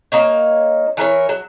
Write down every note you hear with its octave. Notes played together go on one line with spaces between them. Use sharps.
A#3 D#4 C#5
E3 A#4 B4 C#5
F#3